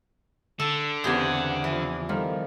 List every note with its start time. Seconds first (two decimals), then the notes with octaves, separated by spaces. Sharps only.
0.60 D3 A4
1.04 E2 C#3 B3 C4 G4 G#4 F#5 G6
1.64 E3 F3
2.09 D#3 F3 G3 A4